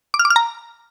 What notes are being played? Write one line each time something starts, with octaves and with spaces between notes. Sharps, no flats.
D6
F6
D6
F6
A#5